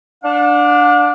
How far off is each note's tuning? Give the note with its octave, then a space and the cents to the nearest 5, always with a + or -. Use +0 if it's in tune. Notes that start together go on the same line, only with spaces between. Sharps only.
D4 +0 F#5 -45